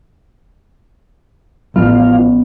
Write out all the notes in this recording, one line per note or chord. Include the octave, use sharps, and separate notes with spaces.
A1 F3 B3 F4 F5